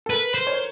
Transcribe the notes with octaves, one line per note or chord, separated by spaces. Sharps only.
A4
A#4 B4
C5
C#5